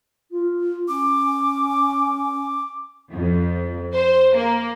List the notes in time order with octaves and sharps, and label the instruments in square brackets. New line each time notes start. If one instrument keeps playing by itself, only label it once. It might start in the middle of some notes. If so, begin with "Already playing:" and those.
[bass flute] F4
[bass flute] C#4 [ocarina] D6
[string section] F2
C5
A#3